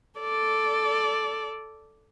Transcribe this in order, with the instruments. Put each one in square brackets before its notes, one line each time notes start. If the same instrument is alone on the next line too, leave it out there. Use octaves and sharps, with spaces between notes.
[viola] A4 D5